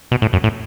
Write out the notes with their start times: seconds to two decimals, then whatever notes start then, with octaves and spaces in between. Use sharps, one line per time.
0.11 B2
0.22 A2
0.33 F#2
0.44 A2